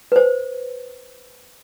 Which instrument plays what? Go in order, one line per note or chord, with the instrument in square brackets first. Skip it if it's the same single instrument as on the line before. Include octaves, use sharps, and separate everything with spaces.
[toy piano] B4 C5